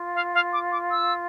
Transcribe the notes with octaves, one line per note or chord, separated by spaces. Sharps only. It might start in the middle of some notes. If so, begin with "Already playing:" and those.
Already playing: F4
F5
F5
D6
D6
E6